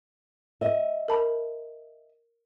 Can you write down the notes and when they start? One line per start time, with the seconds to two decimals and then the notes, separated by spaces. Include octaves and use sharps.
0.61 D#5 E5
1.08 A#4 A5 B5